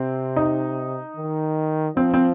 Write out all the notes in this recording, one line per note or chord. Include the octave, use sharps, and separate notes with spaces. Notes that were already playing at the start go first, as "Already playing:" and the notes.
Already playing: C3 C4
D#4
D#3
F3 C4
C4